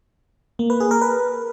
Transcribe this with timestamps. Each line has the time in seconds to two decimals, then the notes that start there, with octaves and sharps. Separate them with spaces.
0.59 A#3
0.70 B4
0.80 G#4
0.91 A#4
1.01 B4